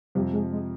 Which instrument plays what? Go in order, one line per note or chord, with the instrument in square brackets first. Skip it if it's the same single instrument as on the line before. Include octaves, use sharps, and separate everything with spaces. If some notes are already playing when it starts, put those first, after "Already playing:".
[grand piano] F2 C3 F3 [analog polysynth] G3
[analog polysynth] G#3
G#3